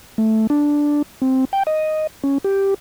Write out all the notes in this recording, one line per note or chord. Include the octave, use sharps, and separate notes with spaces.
A3
D4
C4
G5
D#5
C#4
G4